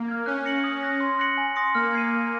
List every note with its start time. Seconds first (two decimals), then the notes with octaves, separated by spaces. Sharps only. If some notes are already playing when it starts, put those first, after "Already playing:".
Already playing: A#3
0.08 F6 G#6
0.26 C#4 F#6
0.45 A#6 C#7 F#7
0.64 D#6
0.82 F#6 A#6
1.00 C6
1.19 F#6 A#6 C#7 F#7
1.38 G#5
1.56 C6 D#6 A#6 C#7
1.75 A#3 F6
1.93 G#6 C7 D#7
2.12 F6